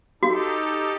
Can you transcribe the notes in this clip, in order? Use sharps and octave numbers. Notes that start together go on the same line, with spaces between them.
D#4 F#4 G4 A4